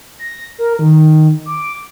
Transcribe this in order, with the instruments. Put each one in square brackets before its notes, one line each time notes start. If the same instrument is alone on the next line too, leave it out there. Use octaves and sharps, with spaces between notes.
[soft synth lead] A#6
A#4
D#3
D6